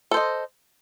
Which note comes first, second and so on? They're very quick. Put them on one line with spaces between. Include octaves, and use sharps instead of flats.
A4 C5 D#5